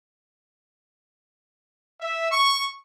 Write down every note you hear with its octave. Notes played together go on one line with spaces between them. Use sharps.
E5
C#6